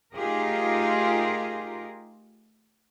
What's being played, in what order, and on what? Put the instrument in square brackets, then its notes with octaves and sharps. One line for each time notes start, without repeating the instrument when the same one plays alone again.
[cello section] A3 D#4 F4 G4 G#4 A#4